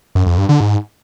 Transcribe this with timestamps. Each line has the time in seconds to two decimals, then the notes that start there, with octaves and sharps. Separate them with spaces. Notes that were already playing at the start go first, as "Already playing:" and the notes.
0.15 F#2
0.27 F2
0.38 G2
0.49 D3
0.60 G#2